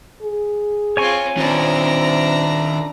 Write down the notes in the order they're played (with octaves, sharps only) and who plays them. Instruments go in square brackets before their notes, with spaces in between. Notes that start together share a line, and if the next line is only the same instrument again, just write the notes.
[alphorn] G#4
[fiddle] C4 F4 [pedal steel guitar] C#5 G#5 C#6
[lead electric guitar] D#3 F4 [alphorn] C4 [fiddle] D4 A#5